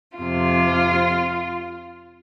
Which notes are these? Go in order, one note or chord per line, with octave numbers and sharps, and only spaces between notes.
F2 C3 F4